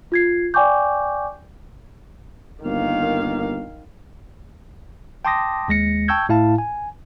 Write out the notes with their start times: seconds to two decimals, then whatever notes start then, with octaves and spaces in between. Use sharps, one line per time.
0.12 F4 G#6 C7
0.54 D5 G5 G#5 C#6 D6 G6
2.64 G1 D#3 A#3 F5
5.25 G5 A5 C6 D6 D#6 A#6
5.68 D#2 G#3 A#6 C#7
6.08 G5 A5 C#6 E6 G6 G#6
6.29 A2 E4 F5 A5
6.58 G#5